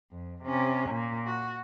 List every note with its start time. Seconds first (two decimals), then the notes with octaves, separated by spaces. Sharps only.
0.12 F2
0.43 C3 C#4
0.89 A#2
1.26 F#4